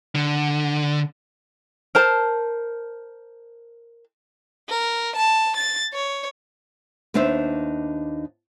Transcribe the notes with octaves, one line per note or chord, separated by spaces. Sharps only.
D3
A#4 C5 A5
A#4
A5
A6
C#5
D#2 B3 D4 D#4 C5 E5